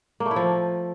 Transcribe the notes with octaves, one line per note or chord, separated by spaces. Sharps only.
A#3
A3
E4
F3